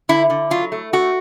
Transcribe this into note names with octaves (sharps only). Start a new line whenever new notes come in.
D3 E4
D3
F#3 F4
A3
A3 F#4